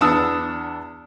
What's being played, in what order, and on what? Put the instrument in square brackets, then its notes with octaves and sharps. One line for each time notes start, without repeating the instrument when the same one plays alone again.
[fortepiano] E2 B3 D4 A5 D#6 E6